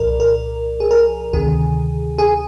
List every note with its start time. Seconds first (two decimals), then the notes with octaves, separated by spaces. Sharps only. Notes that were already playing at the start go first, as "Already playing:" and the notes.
Already playing: C2 A#2 F3 A#4 D5
0.20 A#4
0.80 G#4
0.91 A#4
1.33 D2 C3 D#3 G#4
2.18 G#4